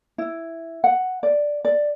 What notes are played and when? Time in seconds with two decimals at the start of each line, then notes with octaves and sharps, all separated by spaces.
0.18 E4
0.84 F#5
1.23 D5
1.65 D5